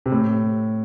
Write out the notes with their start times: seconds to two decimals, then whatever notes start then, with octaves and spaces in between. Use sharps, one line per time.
0.06 C3
0.12 A2